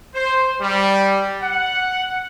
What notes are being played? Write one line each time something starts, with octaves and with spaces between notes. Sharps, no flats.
C5
G3
F#5